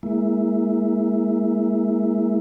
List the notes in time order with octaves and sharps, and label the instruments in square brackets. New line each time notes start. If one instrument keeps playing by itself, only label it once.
[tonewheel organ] G#3 A#3 E4